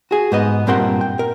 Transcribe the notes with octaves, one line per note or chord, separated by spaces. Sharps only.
F#4 G#4
G#2 B3 D#5
G2 A#2 C4 A#4 F#5 C6
G5
A#4